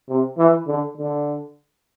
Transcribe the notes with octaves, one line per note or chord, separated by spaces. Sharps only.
C3
E3
D3
D3